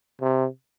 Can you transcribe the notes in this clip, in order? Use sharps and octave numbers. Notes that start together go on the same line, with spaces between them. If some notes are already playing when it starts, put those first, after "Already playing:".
C3